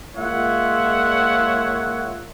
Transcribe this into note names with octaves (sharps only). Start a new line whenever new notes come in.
G#3 A#3 F4 C#5 E5 F#5